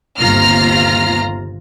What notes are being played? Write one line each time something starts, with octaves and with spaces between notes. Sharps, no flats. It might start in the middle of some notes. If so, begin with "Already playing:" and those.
G1 D#2 C3 F4 A#5 F6